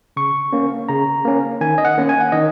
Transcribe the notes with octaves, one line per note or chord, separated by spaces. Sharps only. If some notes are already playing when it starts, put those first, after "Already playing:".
C#3 C#6
A#3 C#4
C#3 A#5
A#3 C#4
D#3 G#5
D#5
F#5
A#3 C#4
G#5
F#5
D#3 D#5